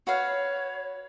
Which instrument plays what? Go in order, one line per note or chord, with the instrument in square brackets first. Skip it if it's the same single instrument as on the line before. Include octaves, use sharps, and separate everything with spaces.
[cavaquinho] F#4 B4 F5 [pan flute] C#5